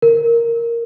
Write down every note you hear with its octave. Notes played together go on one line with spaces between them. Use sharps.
A#4